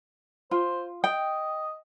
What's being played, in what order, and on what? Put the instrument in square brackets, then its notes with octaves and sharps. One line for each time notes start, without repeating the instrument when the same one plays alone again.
[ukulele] F4 [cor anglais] C5
[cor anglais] D#5 [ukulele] G5